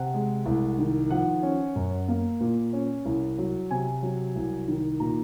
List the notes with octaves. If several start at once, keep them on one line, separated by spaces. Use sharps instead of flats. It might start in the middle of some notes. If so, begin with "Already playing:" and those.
Already playing: C3 F#5
G#3
C2
D#3
F3 F#5
C#4
F#2
A#3
A#2
C#4
C2
F#3
C3 G#5
F#3
C2
D#3
A#2 A#5